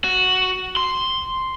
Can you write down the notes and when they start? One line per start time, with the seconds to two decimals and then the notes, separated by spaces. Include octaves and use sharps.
0.04 F#4
0.77 C6